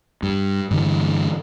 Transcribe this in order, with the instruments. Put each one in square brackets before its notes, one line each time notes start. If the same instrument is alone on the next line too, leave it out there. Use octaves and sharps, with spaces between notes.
[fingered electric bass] G2
G2 D3 E3